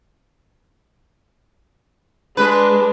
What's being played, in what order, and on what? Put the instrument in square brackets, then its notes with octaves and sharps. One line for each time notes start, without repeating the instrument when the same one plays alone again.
[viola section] G#3 D4 [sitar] B4